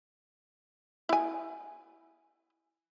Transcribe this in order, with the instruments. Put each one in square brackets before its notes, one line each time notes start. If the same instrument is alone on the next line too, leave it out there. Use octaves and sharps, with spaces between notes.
[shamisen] E4 G#5